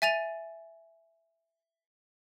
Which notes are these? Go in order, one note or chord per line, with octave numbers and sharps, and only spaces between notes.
E5 G#5 A6 D#7 F7